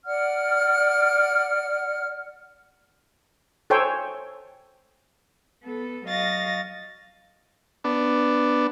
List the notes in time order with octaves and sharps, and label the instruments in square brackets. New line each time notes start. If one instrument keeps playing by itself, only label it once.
[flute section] D5 F#5 F6
[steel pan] A4 C5 C#5 G5 G#5
[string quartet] B3 A4
F#3 D#5 F5 C#6 A6 A#6
[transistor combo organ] B3 D4